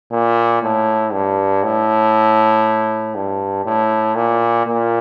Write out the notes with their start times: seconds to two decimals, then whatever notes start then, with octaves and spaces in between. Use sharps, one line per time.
0.12 A#2
0.63 A2
1.12 G2
1.63 A2
3.15 G2
3.65 A2
4.15 A#2
4.66 A#2